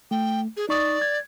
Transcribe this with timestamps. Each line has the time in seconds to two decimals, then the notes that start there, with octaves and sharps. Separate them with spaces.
0.11 A3 G5
0.57 G#4
0.69 D#4 D5 C#6 D#6
1.02 G#6